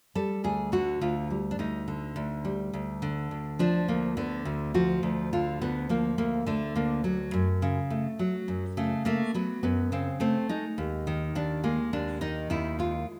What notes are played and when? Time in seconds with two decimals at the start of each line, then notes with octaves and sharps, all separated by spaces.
0.15 G3 A4
0.44 D2 G#4
0.72 D3 F#4
1.01 D2 F4
1.30 G3
1.51 D4
1.59 D2 D#4
1.88 D3
2.16 D2
2.45 G3
2.73 D2
3.02 D3
3.31 D2
3.59 F3 D4
3.88 D2 A#3
4.17 D3 B3
4.45 D2
4.74 F3 F#4
5.03 D2
5.33 D3 F4
5.61 D2 B3
5.89 F3 A#3
6.18 D2 A#3
6.47 D3 A3
6.76 D2 A#3
7.04 F#3
7.33 F#2
7.62 C#3
7.90 A3
8.19 F#3
8.48 F#2
8.77 C#3 A3
9.05 A3 A#3
9.34 F#3 B3
9.63 F#2 B3
9.92 C#3 C4
10.20 A3 C4
10.49 G#3 D#4
10.78 D#2
11.07 D#3
11.35 D#2 D4
11.64 G#3 A#3
11.93 D#2 D4
12.21 D#3 D#4
12.50 D#2 E4
12.79 G#3 F4